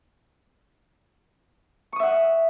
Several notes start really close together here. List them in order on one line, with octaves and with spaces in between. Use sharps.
C#6 D#6 E5 F#5